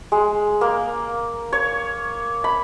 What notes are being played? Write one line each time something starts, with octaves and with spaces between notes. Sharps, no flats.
G#3
A#3
C#5
B5